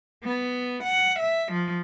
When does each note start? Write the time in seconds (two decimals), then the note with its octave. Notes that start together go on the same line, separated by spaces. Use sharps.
0.24 B3
0.84 F#5
1.19 E5
1.52 F3